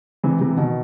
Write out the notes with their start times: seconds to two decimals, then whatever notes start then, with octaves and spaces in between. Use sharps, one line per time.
0.24 C3 E3
0.41 C3 E3
0.57 B2 D#3